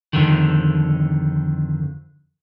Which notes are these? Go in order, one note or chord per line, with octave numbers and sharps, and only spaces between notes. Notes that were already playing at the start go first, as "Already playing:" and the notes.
F2 D3 D#3